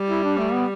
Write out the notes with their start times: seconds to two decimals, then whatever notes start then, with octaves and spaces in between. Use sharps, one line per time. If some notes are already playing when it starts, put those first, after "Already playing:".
Already playing: G3
0.08 E4
0.23 D4
0.38 A3
0.53 B3